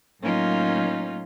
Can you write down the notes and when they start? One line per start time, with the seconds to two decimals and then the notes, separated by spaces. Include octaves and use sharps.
0.21 A2 F#3 A#3 C#4 D#4 F4